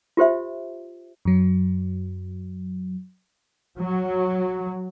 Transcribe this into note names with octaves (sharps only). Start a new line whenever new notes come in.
F4 G4 C5 E5
F#2 F#3
F#3